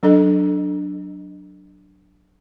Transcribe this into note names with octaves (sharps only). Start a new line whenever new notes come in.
F#3 D4 A4 D#5